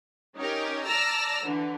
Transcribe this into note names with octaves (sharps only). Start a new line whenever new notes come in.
C#4 D#4 G4 A#4
D5 A5 A#5 E6 F6 A#6
D3 E3